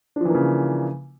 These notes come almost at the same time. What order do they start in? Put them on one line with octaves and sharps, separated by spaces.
D4 F3 E3 A#3 C#3